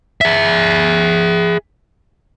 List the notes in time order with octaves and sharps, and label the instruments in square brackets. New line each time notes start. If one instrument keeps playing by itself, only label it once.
[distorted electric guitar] G#4 E5